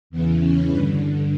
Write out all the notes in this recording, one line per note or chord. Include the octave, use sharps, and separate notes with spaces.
E2 C#3 E3 B3
C#4
G2 D3 B4